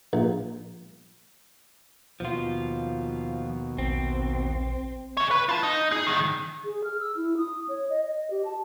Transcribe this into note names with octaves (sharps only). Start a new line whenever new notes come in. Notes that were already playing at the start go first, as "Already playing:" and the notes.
A#1
D#2 B2 F3 F4
A#1 C4
G#4 C#5
B4
F4 A5
D#4
G#4
G2 D#3
G#4
F6
E6
E4
D#6
C#5
D#5
D#5
G4
A5